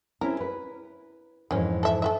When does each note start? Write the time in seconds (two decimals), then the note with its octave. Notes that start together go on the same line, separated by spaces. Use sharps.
0.21 C4 C#4 E4 A#4
0.40 B4
1.51 F2 G#2 D#3 E3 C#4
1.83 A4 E5
2.02 A4 B4 E5